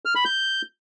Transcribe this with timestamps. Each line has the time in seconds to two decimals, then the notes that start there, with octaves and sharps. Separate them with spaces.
0.05 F6
0.15 B5
0.25 G6